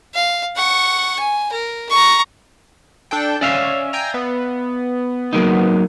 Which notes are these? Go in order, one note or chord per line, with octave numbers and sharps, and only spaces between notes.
F5
F#5 C#6
G#5
A#4
A#5 C#6
D4 A4 G5
C#4 D5 E5 F5
G5 G#5 A#5
B3
F#3 A#3 D#4